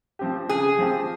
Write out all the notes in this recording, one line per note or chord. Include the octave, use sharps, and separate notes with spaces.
F3 C4 G4
C#3 G#4
F3 C4 G4